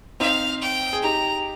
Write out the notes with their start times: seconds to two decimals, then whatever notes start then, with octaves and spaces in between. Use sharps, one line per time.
0.20 C4 D#4 F5
0.62 G5
0.93 G#4
1.03 D#4 G4 A#5